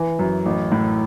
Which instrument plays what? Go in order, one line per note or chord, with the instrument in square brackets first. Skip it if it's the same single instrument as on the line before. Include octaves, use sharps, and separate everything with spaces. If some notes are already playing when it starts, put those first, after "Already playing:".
Already playing: [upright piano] E3
F#2
A1
A2